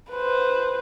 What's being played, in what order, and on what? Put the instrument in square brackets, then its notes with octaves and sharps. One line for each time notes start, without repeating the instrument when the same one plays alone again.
[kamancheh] B4 C5